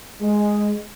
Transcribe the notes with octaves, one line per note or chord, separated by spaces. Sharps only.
G#3